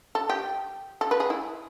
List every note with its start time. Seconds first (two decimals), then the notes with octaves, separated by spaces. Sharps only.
0.15 A4
0.29 G4
1.01 A4
1.11 B4
1.20 G#4
1.30 E4